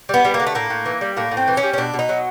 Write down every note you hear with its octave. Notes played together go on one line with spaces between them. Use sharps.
G3 B3
G3
A#3
D3
A3
A2 A#3
A2
E3
G3
A2 A#3
A2
C4
E3
C#4
G3
C#4
B2 D4
B2
D#4
F#3